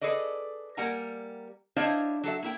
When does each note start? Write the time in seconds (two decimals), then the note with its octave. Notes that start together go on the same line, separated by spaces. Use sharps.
0.01 G#4 A4 B4 D5 D#5
0.77 G3 A#3 A#4 F#5 G#5 A#5
1.76 D4 E4 C5 C#5 D#5 F5
2.24 F#3 A4 E5
2.43 A#3 E4 G5